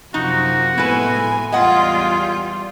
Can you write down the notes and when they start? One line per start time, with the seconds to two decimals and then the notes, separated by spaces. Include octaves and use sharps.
0.14 F#2 C3 F3 D#4 F#4
0.78 A2 G#3 B3 E4 B4 G#5
1.52 E2 G3 F4 G#4 D#5 F#5